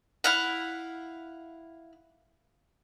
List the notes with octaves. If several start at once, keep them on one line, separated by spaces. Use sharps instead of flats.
E4 F5 F#5